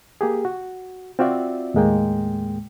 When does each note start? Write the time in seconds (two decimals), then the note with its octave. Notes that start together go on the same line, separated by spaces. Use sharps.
0.21 A#3 G4 G#4
0.45 F#4
1.19 C4 F4 F#4 D5 E5
1.74 D#2 A2 G#3 A#3 G5